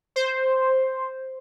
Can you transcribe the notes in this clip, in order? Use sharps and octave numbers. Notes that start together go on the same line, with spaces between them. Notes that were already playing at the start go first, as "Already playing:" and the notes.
C5